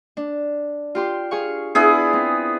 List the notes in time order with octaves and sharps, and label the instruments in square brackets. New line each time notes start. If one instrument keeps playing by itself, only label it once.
[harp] D4
F4 G4 C6
G#4 F5 C#6
[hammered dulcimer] B3 E4 G#4 [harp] D4
[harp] C4